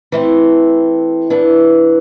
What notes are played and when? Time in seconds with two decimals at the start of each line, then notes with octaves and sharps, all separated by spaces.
0.12 E3 A3 C4
1.30 E3 B3 D4